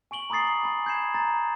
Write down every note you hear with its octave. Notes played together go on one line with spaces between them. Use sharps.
G#5 C#6 D7 F#7 G7
A#5 B5 D6 D#6 A6 C7
A6
G#5 B5
G6 G#6 C7 E7
A#5 C6 A6